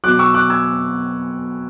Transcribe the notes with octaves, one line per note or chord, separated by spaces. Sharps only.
B2 F#3 D6 F#6
C#6 E6
D6 F#6
E6 G#6